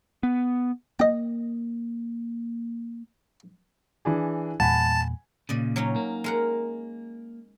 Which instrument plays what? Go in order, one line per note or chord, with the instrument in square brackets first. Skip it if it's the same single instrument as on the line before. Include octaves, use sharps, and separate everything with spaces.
[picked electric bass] B3
[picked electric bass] A#3 [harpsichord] D#5 G5
[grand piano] E3 D4 G#4
[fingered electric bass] E2 A#2 G3 [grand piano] F#5 G#5 B5 [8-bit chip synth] A5
[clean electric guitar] A#2 C#3 [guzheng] D5 D#5
[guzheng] F#3 C#4 D#4
[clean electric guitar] A#3
[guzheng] G#3 A#4 F#5